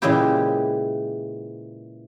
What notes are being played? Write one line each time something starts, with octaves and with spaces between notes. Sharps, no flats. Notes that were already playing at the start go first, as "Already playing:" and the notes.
A#2 C#3 E3 G#3 E4 G4